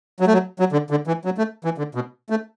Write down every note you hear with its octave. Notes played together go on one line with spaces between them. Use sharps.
F#3
A3
F#3
F#3
D3
D3
E3
F#3
A3
E3
D3
B2
A3